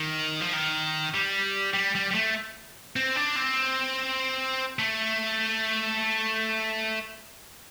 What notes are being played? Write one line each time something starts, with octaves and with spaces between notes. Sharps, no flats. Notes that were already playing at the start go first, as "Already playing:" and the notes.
Already playing: D#3
F3
D#3
G3
G3
G3
G3
A3
C4
D4
C4
A3